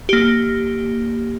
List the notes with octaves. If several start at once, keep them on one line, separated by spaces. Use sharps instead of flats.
A#3 G4